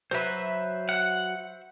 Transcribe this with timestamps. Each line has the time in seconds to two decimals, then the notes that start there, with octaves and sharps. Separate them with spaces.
0.11 F#3 B4 C5 E5
0.89 F#5